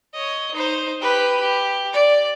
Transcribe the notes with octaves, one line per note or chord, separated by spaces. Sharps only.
C#5 D#5
D#4 C5
G4 B4
G4
D5